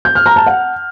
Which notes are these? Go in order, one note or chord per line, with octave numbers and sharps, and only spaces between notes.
G6
F6
A#5
A5
F#5